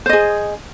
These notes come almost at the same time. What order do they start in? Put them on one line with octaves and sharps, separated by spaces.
C5 D#5 G#4